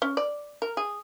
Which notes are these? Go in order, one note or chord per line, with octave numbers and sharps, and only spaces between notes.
C#4
D5
A#4
G#4